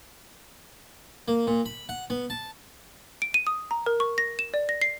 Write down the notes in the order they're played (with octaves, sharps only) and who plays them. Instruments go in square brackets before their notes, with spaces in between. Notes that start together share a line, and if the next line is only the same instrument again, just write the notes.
[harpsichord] A#3
A#2
B5
F#5
B3
A5
[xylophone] D7
D#7
D#6
A#5
A#4
C#6
A#6
E7
D5
A#6
C7